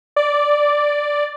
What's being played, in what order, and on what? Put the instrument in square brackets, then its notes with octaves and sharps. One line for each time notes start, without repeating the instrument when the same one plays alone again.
[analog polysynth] D5